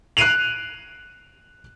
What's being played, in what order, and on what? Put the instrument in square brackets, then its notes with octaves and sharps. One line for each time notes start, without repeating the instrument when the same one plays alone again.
[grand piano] F#6 C7 D7 D#7 F7 F#7